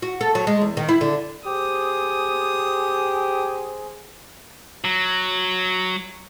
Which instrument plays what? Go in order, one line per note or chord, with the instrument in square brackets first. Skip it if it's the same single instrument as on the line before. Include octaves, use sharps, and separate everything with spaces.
[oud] F#4
A4
F#3
G#3
E2
D#3
E4
D3
[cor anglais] G4 [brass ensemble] G#4 C5 [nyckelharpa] D#6
[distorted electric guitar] F#3